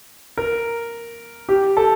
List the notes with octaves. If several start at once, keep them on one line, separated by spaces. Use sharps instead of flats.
A#4
G4
A4